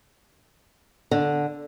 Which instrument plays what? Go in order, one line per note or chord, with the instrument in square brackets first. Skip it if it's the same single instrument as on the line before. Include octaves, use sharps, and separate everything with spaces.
[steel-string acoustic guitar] D3